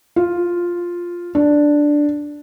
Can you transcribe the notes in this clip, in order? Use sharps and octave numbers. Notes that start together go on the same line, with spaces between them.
F4
D4